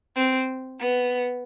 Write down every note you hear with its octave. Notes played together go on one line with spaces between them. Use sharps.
C4
B3